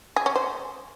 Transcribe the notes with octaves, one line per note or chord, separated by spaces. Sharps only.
G#4
C#4
C5